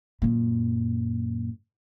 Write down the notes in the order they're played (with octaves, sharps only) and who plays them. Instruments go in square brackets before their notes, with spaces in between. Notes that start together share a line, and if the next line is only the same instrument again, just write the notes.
[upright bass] F#2 A#2